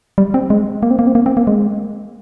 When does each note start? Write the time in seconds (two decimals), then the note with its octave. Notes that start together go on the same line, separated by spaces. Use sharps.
0.18 G3
0.34 C4
0.50 G#3
0.83 A#3
0.91 C4
0.99 A#3
1.07 C4
1.15 A#3
1.26 C4
1.37 A#3
1.47 G#3